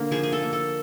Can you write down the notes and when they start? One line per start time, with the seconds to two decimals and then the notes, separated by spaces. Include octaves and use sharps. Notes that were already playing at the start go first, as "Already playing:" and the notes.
Already playing: D3 A#3
0.11 F3 G#4
0.23 G#4
0.33 A4
0.43 A#3
0.53 A4